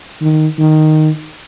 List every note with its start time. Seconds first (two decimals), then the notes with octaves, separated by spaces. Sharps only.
0.22 D#3
0.59 D#3